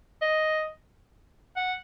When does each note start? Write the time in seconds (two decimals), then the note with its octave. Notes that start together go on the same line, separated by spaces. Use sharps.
0.22 D#5
1.57 F#5